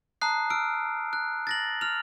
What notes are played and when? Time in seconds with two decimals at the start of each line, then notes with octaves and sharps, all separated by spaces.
0.21 A5 A#5 D#6 F#6 C7
0.50 E6 F6 D7
1.13 F#6
1.47 A6 A#6 F#7
1.81 F6 F7